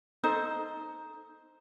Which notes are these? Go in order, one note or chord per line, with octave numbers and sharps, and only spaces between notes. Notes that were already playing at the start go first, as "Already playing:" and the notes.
D#4 A4 C5 D#5